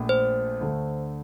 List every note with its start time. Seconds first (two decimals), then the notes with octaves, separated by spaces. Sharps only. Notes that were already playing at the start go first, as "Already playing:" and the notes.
Already playing: A#1 A#2 A3
0.09 C5
0.61 D2 D3 A3